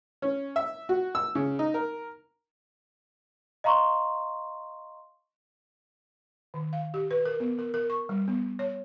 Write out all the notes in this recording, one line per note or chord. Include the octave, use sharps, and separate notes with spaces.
C#4
E5
F#4
E6
C#3
D#4
A#4
D#5 F5 A#5 C6 C#6
D#3
F5
G4
B4
A#4
B3
A#4
A#4
C#6
G3
B3
C#5